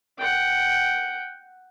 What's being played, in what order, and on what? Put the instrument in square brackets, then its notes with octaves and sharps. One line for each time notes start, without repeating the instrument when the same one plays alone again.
[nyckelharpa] F#5 G5